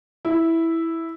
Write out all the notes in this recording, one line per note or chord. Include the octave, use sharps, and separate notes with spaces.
E4